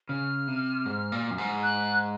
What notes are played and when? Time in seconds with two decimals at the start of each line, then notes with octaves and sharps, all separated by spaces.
0.09 C#3 F6
0.48 C3
0.86 G#2
1.12 A#2
1.31 F#2
1.38 G#2
1.63 F#6